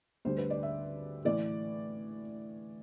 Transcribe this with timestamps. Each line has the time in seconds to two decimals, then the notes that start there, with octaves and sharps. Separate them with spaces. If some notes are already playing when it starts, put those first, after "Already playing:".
0.25 D2 D3 G3 C5
0.38 B4
0.50 D5
0.63 E5
1.25 A2 E3 D5